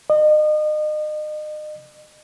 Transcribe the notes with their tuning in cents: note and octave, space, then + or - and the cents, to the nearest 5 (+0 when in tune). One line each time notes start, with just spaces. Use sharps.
D#5 -35